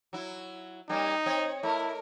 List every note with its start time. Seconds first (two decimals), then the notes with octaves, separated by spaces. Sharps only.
0.13 F#3 E4
0.89 G3 A#3 C#4 D#4
1.26 C4 C#5 D#5
1.63 A3 E4 A#4